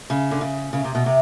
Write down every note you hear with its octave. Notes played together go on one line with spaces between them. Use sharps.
C#3
D3
C#3
C#3
C3
B2
C3